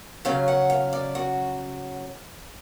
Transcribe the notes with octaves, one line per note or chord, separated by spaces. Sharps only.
C#3 F#3 C#4 F5
F#5
F5
D5
F#4